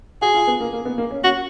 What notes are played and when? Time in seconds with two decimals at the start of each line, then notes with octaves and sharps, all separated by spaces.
0.22 F#4 G#4
0.34 F4
0.47 B3
0.60 A#3
0.73 A#3
0.85 B3
0.98 A#3
1.11 C#4
1.24 C#4 F#4